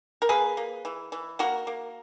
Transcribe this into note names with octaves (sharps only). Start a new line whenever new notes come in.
A#4
A#3 G#4 B4
A#3
E3
E3
A#3 F#4 A#4
A#3